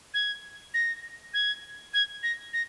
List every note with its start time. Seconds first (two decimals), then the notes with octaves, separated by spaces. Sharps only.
0.14 G#6
0.74 A#6
1.34 G#6
1.94 G#6
2.23 A#6
2.53 A#6